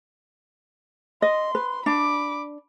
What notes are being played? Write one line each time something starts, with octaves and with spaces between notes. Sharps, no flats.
D#5 C6
B4
D4 B5 D6